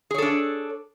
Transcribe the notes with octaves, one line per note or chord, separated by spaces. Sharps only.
D4 G#4 A4 C#5